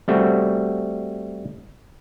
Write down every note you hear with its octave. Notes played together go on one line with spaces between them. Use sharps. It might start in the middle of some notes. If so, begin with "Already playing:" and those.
G3 A3 C4 F#4